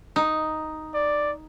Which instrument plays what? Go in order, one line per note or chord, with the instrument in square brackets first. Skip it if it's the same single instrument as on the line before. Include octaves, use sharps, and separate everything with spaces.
[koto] D#4
[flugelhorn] D5